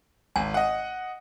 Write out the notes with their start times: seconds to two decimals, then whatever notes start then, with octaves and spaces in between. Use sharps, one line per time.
0.36 G#1 G#5
0.54 D#5 F#5